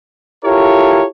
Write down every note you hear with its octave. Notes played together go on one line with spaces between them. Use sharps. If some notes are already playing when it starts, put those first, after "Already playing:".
E4 F4 G4 A4 A#4 C#5